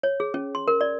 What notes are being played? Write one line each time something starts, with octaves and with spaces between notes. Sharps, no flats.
C#5
G#4
C#4
C6
A#4
D5